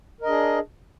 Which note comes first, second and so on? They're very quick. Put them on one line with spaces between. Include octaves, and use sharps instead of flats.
A#4 D#5 D4 G#4